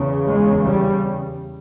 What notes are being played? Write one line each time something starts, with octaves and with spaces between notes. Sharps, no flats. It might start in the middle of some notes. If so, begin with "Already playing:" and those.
Already playing: E2 C#3
G#3
G3